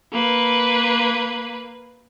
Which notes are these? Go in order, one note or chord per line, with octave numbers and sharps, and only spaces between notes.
A#3 B4